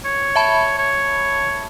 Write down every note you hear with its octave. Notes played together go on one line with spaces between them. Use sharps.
C#5
E5 A5 B5
C#5